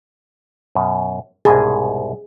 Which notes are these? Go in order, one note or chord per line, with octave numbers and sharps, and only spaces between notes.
F#2 B2
C2 G#2 B2 G#4